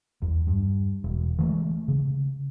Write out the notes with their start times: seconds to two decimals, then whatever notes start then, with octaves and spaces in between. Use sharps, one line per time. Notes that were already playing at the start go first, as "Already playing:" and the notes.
0.22 E2
0.47 G2
1.04 E1
1.38 E3 F3 G#3 A3
1.88 C#3